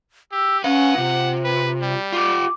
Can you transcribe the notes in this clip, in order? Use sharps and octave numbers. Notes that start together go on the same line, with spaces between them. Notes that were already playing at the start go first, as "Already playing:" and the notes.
G4 E6
C#4 B4 F5 F#5
C3 F4
B4
G3
F4 G4 D6